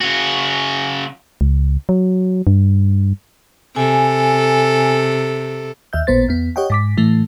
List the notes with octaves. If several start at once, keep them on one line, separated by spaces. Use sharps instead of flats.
C#3 F#4
C#2
F#3
G2
C3 A4 G#5
D#2 E5 G6
A1 A#2 B3 C5 A6
E2 B3
G4 C#5 D#5 F#5 G5
G#2 D6 B6
A2 E3 A3